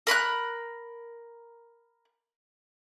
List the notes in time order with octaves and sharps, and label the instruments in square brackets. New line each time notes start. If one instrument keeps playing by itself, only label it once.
[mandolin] A#4 B5 C6 F#6